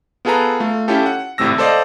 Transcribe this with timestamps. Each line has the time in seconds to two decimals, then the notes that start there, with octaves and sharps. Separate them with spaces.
0.25 B3 F4 G#4 A4 B4 A#5
0.60 A3 F4
0.88 C#4 E4 F4 G4 A4
1.06 F#5
1.38 G#1 A2 C3 A3 E6 A#6
1.58 A4 C5 D5 D#5 F5